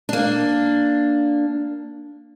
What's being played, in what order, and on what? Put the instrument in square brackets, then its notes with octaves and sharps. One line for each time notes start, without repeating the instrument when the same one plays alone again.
[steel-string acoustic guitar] A#3 D4